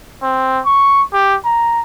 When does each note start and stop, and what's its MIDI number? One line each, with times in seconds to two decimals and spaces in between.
0.22 0.60 60
0.66 1.02 85
1.13 1.36 67
1.45 1.82 82